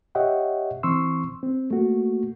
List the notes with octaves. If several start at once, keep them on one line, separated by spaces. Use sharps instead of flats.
G4 C#5 D#5 E5 F#5 G5
E3 C4 C6 C#6 E6
C4
A3 A#3 F#4